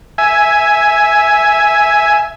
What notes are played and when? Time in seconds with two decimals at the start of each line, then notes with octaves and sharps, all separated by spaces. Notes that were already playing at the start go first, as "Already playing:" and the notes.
0.18 E5 G#5